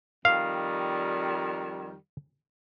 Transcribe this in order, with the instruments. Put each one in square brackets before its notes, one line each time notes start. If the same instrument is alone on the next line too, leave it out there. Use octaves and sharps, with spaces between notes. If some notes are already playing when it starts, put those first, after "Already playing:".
[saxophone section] F2 D#3 G3 [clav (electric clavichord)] F5